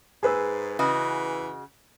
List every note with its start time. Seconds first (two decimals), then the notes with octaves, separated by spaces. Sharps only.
0.23 G#2 G#4 B4 E6
0.79 C#3 E3 F#4 D#5